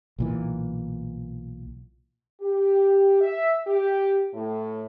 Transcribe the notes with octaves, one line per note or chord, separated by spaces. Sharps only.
B1 A#2 E3
G4
E5
G4
A2